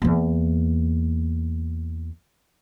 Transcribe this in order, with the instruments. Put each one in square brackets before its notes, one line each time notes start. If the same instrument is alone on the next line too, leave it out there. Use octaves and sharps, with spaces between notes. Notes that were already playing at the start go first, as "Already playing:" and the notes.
[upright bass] E2 A#3